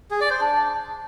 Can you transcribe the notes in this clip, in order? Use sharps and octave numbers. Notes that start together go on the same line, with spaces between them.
G#4
D5
C5
D4